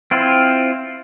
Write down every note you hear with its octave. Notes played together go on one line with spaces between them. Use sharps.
C4 E4 F4